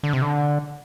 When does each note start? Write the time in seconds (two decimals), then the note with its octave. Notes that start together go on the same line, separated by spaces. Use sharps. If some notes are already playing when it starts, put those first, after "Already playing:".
0.03 D3
0.13 C3
0.22 D3